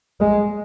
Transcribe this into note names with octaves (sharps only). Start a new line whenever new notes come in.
G#3